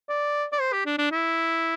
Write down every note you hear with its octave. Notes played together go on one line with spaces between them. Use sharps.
D5
D5
C5
G4
D4
D4
E4